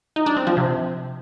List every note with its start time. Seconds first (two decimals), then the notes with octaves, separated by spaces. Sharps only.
0.16 D#4
0.26 D4
0.37 C4
0.47 F3
0.57 C3